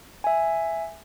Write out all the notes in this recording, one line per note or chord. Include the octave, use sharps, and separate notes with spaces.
E5 G#5